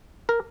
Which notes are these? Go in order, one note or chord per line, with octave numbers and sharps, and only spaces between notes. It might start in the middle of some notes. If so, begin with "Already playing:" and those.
A#4